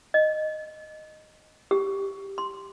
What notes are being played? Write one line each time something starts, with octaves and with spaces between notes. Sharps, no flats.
D#5
G4
C6